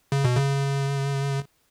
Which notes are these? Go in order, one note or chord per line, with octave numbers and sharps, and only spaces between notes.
C#3
B2
C#3